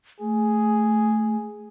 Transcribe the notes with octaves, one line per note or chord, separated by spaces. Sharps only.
A3 G#4